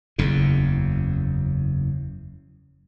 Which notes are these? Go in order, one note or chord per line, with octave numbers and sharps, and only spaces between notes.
F#1 E2 C#3